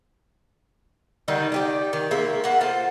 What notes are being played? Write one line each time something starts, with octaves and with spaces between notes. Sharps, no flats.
D3 D#3 G3 D#4
D#4 G4 D5
D#3
G#3 A#3 E5
A#3 F#5
F4 A4 C5